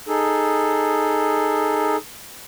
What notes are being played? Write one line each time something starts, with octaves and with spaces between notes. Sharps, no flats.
D#4 G#4 A4